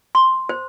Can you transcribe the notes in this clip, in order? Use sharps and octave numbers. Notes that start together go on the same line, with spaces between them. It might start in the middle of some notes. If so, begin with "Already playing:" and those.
C6
C5